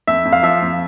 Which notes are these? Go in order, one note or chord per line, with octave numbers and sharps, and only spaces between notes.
F2 E5
F2
F5
F3 E5
F2